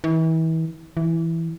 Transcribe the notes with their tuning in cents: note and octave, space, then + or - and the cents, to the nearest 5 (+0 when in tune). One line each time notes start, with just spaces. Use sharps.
E3 -35
E3 +0